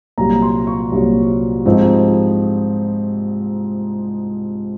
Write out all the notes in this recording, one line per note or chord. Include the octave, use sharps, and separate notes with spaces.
C2 A#2 F#3 A#5
C6
C#6
C2 A#2 F#3
G#2 F3 C4 D#4